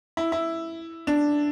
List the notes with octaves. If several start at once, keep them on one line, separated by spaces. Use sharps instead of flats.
E4
E4
D4